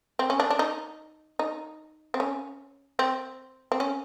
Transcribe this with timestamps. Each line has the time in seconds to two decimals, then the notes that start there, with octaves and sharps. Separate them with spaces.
0.19 C4
0.30 C#4
0.40 D4
0.50 D4
0.59 D#4
1.39 D#4
2.14 C4
2.20 C#4
2.99 C4
3.72 C4
3.80 C#4